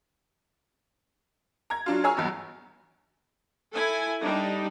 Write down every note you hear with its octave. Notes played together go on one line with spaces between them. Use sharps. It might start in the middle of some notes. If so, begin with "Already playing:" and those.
A#5 G#6
F#3 D4 F4
G#4 C#5 G#5 A#5 E6 F6
B1 E2 G2
E4 A4 G#5
G3 D4 D#4